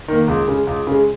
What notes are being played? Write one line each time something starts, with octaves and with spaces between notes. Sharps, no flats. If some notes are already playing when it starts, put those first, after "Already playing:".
D#3 A#3
C#2
C#3 G#3
C#2
C#3 G#3